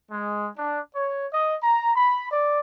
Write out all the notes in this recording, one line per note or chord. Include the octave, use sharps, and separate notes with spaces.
G#3
D4
C#5
D#5
A#5
B5
D5